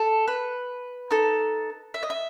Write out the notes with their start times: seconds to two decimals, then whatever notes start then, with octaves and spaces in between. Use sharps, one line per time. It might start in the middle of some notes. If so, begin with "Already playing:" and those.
Already playing: A4
0.28 B4
1.11 D#4 A4
1.94 E5
2.03 D#5
2.10 E5